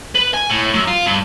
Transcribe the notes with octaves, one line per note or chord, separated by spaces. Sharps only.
B4
G#5
A2
F#2
F4
G2